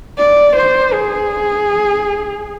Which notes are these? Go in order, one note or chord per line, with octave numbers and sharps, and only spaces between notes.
D5
C5
G#4